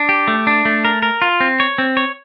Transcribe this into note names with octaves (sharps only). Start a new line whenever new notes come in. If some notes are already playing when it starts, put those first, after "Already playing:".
Already playing: D4
G4
A3
D4
A3
A#4
A#4
F4
C4
C#5
C4
C#5